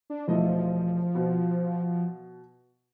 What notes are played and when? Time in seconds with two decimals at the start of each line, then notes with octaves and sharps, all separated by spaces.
0.10 D4
0.28 E1 F3 A3 D#5
1.15 B2